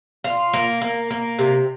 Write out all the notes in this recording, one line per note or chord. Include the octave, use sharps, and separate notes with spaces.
F4
A#3
A#3
A#3
C3